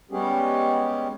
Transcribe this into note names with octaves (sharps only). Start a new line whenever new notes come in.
G3 G#3 B3 C#4 G4 G#4